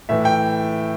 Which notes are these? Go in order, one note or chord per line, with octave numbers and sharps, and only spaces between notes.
A2 E3 E5
G5